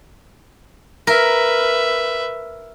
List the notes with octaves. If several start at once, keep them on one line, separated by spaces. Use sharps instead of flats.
A#4 B4 E5